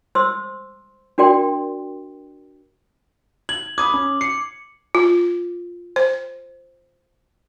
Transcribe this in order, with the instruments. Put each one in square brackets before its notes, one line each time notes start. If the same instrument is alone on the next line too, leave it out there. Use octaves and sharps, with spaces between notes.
[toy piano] C5 C6 D#6 E6
D4 F#4 A#4 D5 G5 C6
[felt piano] G#6 [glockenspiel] F#7
[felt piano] B5 D#6 G#6 [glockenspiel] D6
[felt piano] C#4
[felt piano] C7 [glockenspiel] C#7
[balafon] F4
C5